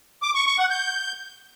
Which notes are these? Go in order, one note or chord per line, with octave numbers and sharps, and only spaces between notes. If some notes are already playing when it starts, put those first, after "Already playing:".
D6
C#6
C#6
F#5
G6